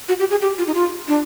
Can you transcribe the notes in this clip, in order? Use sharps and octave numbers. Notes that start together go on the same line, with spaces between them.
F#4
G4
G#4
G4
F4
D#4
F4
D4